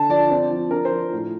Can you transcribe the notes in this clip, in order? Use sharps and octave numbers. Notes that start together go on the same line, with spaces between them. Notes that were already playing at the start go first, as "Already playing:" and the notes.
Already playing: D3 A5
F3 D5
C4 D5
F3
D4 A#4
C5
F3
A2